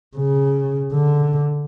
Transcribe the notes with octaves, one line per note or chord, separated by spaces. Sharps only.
C#3
D3